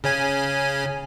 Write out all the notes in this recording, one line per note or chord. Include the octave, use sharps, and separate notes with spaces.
C#3 C#4 G#5